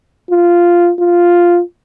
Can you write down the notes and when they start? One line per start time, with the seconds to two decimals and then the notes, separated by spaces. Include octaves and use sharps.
0.31 F4
0.99 F4